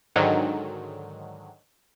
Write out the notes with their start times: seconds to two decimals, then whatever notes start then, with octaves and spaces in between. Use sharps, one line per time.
0.16 G#2 D3 D#3 F#3